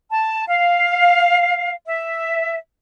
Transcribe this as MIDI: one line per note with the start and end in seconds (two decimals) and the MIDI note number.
0.12 0.44 81
0.47 1.72 77
1.86 2.57 76